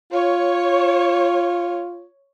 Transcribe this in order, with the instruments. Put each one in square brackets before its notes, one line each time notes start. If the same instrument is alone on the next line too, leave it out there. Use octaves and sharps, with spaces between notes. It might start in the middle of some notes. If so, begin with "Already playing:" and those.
[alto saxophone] F4 [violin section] C#5